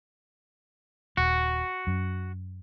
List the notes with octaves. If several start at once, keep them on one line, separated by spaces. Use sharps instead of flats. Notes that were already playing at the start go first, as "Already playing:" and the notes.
D#1 F#4
F#2